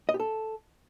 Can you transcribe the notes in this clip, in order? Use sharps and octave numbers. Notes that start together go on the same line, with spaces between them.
D#5
G4
A4